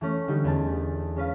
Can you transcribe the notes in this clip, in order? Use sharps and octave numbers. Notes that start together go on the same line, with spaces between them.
E3 A3 C#4
D3 G3 D#4
E2 B3 G#5 A5 A6
G#3 C#4 B4 F5